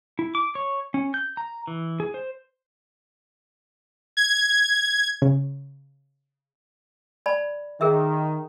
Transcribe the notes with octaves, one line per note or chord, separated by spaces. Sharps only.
E4
D6
C#5
C#4
G6
A#5
E3
G#4
C5
G#6
C#3
D5 A5 B5
D#3 G#4 A#4 E5